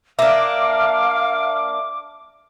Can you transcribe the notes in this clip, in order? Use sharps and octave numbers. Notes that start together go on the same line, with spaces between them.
A#3 D4 E5 F5 D6 F6